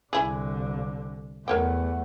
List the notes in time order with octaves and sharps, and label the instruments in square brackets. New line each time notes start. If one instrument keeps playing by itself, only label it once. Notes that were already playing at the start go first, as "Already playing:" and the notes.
[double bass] C2 D3 [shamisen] E4 G#4
[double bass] E2 A3 [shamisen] A#4 C#5 G5 [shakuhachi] F#5